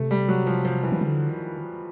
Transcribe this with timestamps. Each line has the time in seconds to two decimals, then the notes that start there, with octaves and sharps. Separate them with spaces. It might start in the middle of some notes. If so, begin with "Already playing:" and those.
Already playing: C3 A3
0.11 G3
0.28 F#3
0.47 F3
0.65 F3
0.83 E3
0.92 D#3
1.01 D3
1.29 D#3